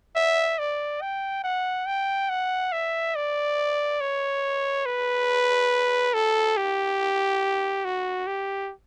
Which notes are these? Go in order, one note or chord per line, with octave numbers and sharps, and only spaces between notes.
E5
D5
G5
F#5
G5
F#5
E5
D5
C#5
B4
A4
G4
F#4
G4